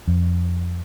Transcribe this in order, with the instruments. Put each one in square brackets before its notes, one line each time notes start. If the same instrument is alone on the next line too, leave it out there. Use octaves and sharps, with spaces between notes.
[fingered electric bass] F2